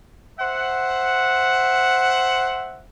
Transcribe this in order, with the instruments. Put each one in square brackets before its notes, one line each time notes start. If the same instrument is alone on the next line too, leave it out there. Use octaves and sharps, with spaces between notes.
[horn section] C5 E5 F#5